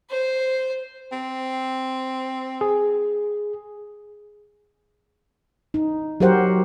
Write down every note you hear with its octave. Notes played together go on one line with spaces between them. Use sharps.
C5
C4
G#4
D#4
F#3 F#4 G4 A#4 C5 F#5